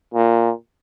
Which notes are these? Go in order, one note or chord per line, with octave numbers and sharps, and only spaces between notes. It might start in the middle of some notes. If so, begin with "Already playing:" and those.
A#2